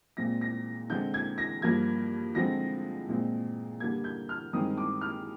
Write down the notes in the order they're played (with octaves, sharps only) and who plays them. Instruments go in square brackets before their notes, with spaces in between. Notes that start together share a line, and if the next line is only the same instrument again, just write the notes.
[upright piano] A#2 G#3 C4 A#6
A#6
D3 G#3 C4 G6
G#6
A#6
G2 F3 A#3 G#6
D3 F3 G#3 C4 A#6
A#2 G#3 C4
D3 G3 A#3 G#6
G6
F6
G2 D#3 G#3 C4 D#6
D6
F6